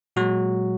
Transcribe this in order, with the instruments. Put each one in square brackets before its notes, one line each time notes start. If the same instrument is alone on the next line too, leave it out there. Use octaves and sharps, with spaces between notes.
[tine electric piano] A#2 F#3 G#3 F#4